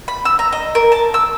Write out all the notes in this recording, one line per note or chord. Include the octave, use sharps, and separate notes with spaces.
B5
E6
A#5
D#5
A#4
A5
E6